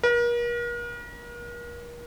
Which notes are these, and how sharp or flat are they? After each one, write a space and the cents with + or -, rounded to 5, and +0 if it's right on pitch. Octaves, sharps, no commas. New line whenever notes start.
A#4 +40